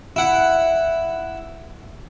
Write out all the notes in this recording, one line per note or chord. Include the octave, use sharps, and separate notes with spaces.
E4 F#5